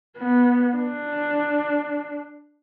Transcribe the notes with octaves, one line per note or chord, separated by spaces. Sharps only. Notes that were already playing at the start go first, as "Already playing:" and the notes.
B3
D4